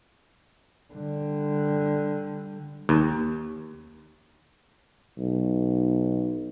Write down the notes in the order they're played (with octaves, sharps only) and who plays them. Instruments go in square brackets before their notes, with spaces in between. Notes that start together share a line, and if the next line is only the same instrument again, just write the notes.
[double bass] D3 G3
[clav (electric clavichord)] D#2
[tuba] B1